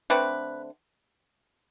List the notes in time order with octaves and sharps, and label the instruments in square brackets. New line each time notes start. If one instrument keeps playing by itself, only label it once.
[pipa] D3 A3 C4 B4